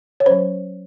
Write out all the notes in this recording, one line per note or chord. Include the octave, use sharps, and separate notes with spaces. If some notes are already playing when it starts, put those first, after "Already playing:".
C#5
F#3 C#4 C5